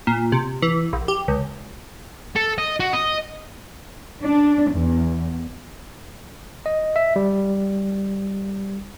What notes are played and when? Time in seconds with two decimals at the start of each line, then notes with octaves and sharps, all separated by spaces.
0.07 A#2
0.32 C3
0.62 E3
0.93 A#1
1.08 G4
1.28 C#2
2.36 A4
2.58 D#5
2.80 F#4
2.93 D#5
4.23 D4
4.72 E2
6.66 D#5
6.96 E5
7.16 G3